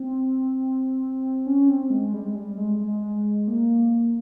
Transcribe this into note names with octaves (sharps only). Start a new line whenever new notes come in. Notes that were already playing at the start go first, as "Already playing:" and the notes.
Already playing: C4
C#4
C4
G#3
G3
G#3
G3
G#3
G#3
A#3